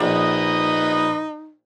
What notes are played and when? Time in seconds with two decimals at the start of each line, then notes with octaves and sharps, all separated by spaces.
0.01 A#1 D#4 B4 D#5 B5